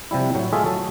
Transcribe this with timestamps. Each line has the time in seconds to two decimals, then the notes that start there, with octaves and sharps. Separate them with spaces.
0.11 C3 F3 G3 E4
0.35 A2 F#3
0.53 G#3 A3 F4 G#4 A4 E5
0.65 F#3 A4